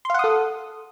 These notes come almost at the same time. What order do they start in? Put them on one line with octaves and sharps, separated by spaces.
C6 F5 F#5 D#6 A4